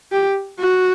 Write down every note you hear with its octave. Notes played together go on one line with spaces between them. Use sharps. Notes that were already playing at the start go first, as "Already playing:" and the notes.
G4
F#4